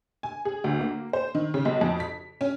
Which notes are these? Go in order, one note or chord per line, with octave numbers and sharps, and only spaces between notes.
G#5
G#4
D2
A#3
C5
D#3
C#3
B1
F2
B6
C#4